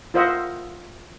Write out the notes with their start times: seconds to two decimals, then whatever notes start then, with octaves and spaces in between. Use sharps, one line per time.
0.14 F4 A#4 C5 D#5 E5 F#5